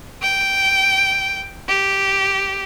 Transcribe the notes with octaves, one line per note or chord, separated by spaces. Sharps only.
G5
G4